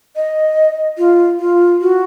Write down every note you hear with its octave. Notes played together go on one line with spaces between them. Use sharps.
D#5
F4
F4
F#4